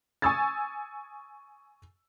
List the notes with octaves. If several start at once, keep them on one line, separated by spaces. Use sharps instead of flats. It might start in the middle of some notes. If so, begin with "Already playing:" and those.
G#5 C#6 D#6 E6 G#6 A6